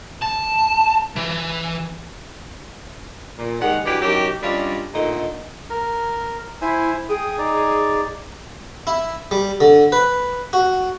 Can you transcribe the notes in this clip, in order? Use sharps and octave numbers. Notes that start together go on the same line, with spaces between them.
A5
E3
A#2
D#3 G#3 G4 G#4 F#5
E3 F#3 D4 G4
F#2 D#3 F#3 G4
G3 C#4 D4 F4 D#5
A#2 D3 A3 D#4
A#4
E4 C5 E5 G#5
G#4 G5 D#6
D#4 D5
E4
G3
D3
B4
F#4